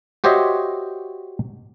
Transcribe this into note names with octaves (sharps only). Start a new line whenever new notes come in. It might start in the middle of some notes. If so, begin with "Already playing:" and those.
F#4 G4 C5 C#5 D#5 E5